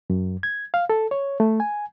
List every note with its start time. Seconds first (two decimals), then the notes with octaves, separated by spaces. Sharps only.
0.10 F#2
0.43 G#6
0.74 F5
0.90 A4
1.11 C#5
1.40 A3
1.60 G#5